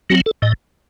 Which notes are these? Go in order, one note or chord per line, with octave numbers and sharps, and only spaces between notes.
F#3 C4 F#4
A4
A2 D#5